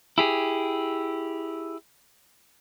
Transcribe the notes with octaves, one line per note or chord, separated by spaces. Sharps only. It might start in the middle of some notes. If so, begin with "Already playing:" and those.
E4 G4 G#4